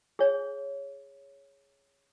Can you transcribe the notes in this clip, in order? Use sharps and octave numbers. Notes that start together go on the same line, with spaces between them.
G#4 C#5